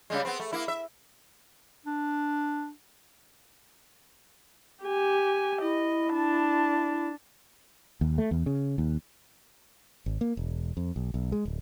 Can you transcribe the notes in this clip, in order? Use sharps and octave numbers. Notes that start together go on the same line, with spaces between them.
C#3 G3 G#3
B3 C4
A3
A#3 E4
E5
D4
G4 G#5
E4 D#5
D4 A5
D#2
A3
E2
C#3
D#2
G#1
A#3
E1
F2
B1
B1
G#3
D1